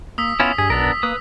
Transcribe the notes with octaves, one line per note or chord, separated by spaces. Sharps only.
A#3 D#6 E6 B6
B3 C#4 E4 F4
G2 G#4 B6
B1 B3 D4 A#4
A#3 B4 D#6